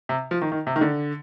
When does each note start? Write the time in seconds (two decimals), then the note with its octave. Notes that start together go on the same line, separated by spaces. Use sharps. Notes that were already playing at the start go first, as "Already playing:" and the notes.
0.09 C3
0.31 F3
0.42 D#3
0.52 D#3
0.67 C3
0.76 D#3
0.81 D3